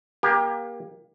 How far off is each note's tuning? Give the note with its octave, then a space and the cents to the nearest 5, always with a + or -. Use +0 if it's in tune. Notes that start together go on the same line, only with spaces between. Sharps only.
A#3 +25 G4 +25